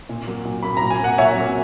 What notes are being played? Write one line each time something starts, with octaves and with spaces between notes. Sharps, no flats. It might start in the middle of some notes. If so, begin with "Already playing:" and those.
A#2
F#3 A#3
A#2
F#3 A#3 B5
A#2 A#5
G#5
F#3 A#3 F#5
A#2 C#5 E5
F#3 A#3